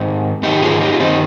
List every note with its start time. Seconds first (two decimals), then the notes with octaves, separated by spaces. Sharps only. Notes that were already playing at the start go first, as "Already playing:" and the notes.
Already playing: G#2 D#3 D#4 G4
0.43 G#2 D#3 D#4 G4
0.62 F4 G#4
0.80 D#4 G4
0.92 F4
1.00 G2 D#3 C4 D#4